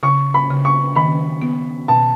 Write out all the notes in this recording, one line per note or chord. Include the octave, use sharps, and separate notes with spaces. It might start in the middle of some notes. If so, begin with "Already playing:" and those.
C#3 C#6
B5
C#3
C#6
D#3 B5
B3
B2 A5